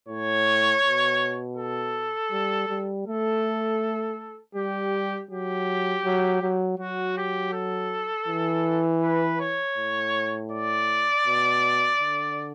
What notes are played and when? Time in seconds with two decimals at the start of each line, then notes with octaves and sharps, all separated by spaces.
0.08 A2 C#5
0.83 B2
1.57 A4
2.32 G3
2.69 G3
3.07 A3 A4
4.55 G3 G4
5.30 F#3 G4
6.05 F#3
6.42 F#3
6.79 F#3 F#4
7.17 G4
7.53 A4
8.28 E3
9.03 B4
9.40 C#5
9.77 A2
10.52 D5
11.26 B2
12.01 D3